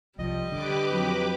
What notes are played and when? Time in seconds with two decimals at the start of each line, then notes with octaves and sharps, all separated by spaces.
0.19 C2 F3 G3 D#5
0.52 D3 G4 B4 D6
0.90 F2 F#3